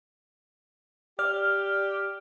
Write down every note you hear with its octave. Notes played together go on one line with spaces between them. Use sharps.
G4 D5 F6